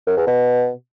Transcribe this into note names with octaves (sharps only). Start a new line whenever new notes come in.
F#2
E2
B2